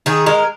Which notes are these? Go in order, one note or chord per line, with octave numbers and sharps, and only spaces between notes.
D#3 G#4
G#3 A#4